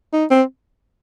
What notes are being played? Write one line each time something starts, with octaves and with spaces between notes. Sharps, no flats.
D#4
C4